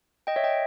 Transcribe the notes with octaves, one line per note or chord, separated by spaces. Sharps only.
D#5 G5
C#5 E5
D#5 G5